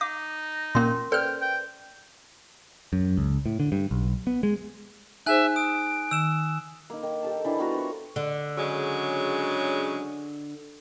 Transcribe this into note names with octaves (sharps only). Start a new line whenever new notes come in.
D#4 F#5 D6
A#2 A#3 C#4 A#4 C6
A4 B4 C5 D5 G5 F6
G5
F#2
C#2
A2
D3
G2
B1
B3
G#3
D#4 G#4 C5 E5 G#5 F#6
D#6 D7
D#3 E6 E7
A#3 D#4
D#3
G4 A4 A5
E3 D4 E4
B3 F4 F#4 A#4
C5 C#6
D3
C#3 F#3 G#3